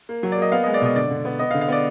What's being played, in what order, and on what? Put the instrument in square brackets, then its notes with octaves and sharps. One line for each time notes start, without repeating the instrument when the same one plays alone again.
[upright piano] A#3
F#3
D5
A#3 D#5
B3 F5
G#3 D#5
D5
B2 D#5
D3 D5
D3
B3
B3 D#5
F5
D3
F5
B3 D5